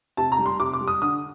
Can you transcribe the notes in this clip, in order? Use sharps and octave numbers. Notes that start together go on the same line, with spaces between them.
C3 A5
A#5
G3
C6
C3 D6
D6
G3
D#6
D3 D#6